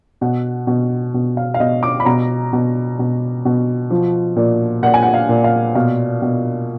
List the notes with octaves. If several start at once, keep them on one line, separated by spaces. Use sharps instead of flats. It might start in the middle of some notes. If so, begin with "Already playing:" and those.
B2 F#5
B2
B2
F5
F5
B2 D#5
D6
B5
B2 A#5
B2
B2
B2
F3
A#2
A#2 F#5
G#5
F#5
F5
A#2
F5
B2 F5
B2